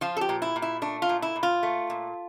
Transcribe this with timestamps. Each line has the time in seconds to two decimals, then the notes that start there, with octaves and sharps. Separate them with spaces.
0.01 F3 F4
0.17 A4
0.21 G4
0.29 A#2
0.42 E4
0.56 A#2
0.62 E4
0.82 A3 D4
1.02 F4
1.09 A#2
1.22 E4
1.36 A#2
1.43 F4
1.63 A3
1.90 A#2